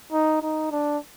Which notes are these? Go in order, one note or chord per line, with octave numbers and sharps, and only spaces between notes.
D#4
D#4
D4